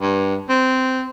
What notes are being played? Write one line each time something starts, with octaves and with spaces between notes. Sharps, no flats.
G2
C4